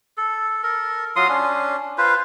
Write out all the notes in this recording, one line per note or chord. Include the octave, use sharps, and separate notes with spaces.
A4
A4 A#4
F#3 F4 C6 D#6
C#4 D4
F4 B4 C5